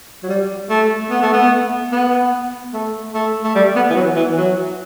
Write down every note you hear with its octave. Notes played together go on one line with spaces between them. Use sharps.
F#3
G3
A3
B3
A3
B3
B3
A3
A3
A3
G3
B3
E3
F#3
E3
F#3